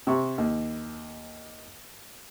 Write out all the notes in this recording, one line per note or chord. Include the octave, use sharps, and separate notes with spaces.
C3 C#6
D#2